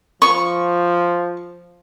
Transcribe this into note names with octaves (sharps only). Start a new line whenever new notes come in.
F3 C#6